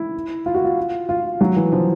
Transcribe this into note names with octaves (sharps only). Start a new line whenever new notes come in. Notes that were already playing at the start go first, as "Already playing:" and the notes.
Already playing: E4
F4
F#4
F4
F4
F#3
E3
F3